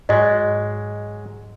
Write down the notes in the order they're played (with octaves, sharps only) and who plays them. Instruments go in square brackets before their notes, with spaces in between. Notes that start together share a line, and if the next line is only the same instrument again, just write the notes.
[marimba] G#2 [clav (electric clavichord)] F#3 G#3 [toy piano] D#5